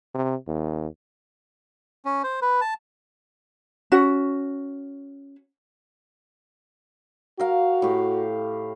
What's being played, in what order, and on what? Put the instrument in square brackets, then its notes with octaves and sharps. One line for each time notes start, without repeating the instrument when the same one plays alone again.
[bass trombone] C3
D#2
[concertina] C#4
C5
B4
A5
[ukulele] C#4 F#4
[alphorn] F#4 [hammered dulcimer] A#4 F5
[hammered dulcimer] A2 G4